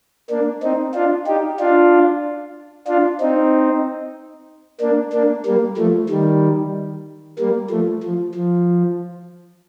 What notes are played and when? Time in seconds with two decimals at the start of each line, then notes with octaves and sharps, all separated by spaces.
0.30 A#3 D4
0.63 C4 D#4
0.94 D4 F4
1.27 D#4 G4
1.60 D4 F4
2.88 D4 F4
3.20 C4 D#4
4.81 A#3 D4
5.13 A#3 D4
5.46 G3 A#3
5.77 F3 A3
6.09 D#3 G3
7.39 G3 A#3
7.70 F3 A3
8.04 F3
8.35 F3